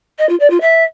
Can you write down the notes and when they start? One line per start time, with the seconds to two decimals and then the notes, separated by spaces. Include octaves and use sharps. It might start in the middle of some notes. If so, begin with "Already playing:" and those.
0.18 D#5
0.29 F4
0.39 D5
0.50 F4
0.61 E5